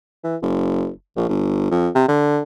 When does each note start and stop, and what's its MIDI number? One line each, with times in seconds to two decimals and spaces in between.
0.24 0.36 52
0.42 0.90 30
1.16 1.25 34
1.29 1.69 31
1.71 1.88 41
1.95 2.04 48
2.08 2.42 50